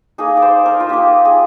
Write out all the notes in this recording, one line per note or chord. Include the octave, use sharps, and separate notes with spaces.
A#3 D#4 G#4
D5
C5
A#4
F4
A#3 D#4 G4
G#4